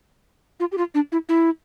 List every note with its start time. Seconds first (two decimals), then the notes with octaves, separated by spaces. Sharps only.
0.60 F4
0.72 G4
0.78 F4
0.94 D4
1.12 E4
1.29 E4